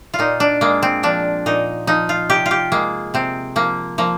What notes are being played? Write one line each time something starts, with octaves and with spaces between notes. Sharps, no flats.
F4
A#2 D#4
D4
G#3 A#3
C4
F3 D4
A#2 D#4
F3 D#4
F4
C3 G4
F4
G4
G#3 A#3
C3 C4
F3 A#3
F3 A#3